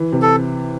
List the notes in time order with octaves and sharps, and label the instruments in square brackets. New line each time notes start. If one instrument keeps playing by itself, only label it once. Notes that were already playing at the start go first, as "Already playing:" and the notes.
Already playing: [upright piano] E3
C3
[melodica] A4